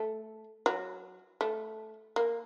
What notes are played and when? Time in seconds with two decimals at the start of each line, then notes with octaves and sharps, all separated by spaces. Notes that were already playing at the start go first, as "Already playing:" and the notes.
Already playing: A3
0.66 F#3
1.41 A3
2.16 A#3